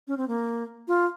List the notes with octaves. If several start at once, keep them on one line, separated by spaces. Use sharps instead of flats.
C#4
C4
A#3
F4